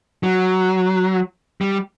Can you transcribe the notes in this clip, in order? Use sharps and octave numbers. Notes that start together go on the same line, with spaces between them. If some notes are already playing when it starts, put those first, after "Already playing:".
F#3
G3